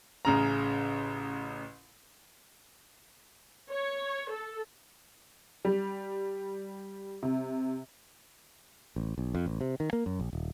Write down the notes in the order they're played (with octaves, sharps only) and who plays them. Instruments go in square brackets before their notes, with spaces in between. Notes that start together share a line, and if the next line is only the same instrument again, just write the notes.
[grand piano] A1 C#3 A#5
[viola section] C#5
A4
[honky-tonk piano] G3
C3
[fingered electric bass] A1
B1
F2
A1
C3
D#3
A#3
F#2
A#1
D#1